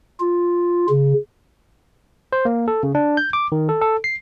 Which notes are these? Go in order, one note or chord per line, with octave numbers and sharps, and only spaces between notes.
F4
C#3
C5
A#3
A4
C#3
D4
G6
D6
D#3
A4
A4
C7